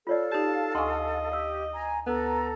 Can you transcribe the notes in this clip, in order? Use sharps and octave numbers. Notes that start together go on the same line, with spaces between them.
F4 A4 C#5 D5 F5
D#4 G4 A5
D2 D#5 G#5 C6 C#6
G4 F5 E6
G#5 A#5
D2 B3 A4 A#5